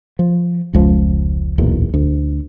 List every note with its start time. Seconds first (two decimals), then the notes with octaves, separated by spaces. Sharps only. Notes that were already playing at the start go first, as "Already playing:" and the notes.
0.19 F3
0.73 F1 C#2 F3
1.58 D1 B1 E2 A#2
1.94 D2